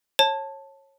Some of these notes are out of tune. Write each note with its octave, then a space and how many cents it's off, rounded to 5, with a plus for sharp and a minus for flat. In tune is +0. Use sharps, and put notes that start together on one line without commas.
C#5 -25 A5 +0